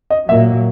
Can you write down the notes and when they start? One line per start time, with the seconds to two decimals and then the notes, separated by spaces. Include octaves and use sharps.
0.10 D#5
0.28 A#2 F#3 A#3 E5